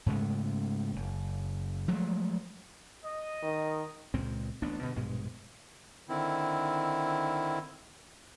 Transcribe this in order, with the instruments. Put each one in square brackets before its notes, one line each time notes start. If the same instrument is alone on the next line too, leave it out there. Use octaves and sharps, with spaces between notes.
[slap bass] G#2 C#3 G#3 A3
F#1
F3 F#3 G#3 A3
[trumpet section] D#5
[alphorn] D#3
[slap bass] C#2 A#2 G#3 C4
A1 D2 B3 D4
G2 B2 D3
A#1 G2 B2 G#3
[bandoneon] D3 D#3 C4 E4